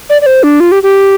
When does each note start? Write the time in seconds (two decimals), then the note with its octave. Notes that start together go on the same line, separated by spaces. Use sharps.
0.10 D5
0.22 D5
0.26 C5
0.43 D4
0.60 F4
0.72 G4
0.83 G4